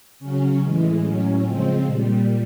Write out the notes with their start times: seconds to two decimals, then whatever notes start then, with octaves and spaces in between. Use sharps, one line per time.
0.19 C#3 F#3 C#4
0.60 A2 E3 G#3
1.01 A2 F#3 C#4
1.42 C#3 F3 G#3 C4
1.83 A#2 G3